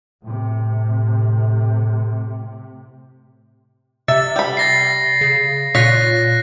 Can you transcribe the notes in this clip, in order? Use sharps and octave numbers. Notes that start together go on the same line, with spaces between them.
A2 C3
C3 E5 A6
G3 B5
A6 A#6 C7
C#3
A#2 F4 C#5 F#6 A#6 B6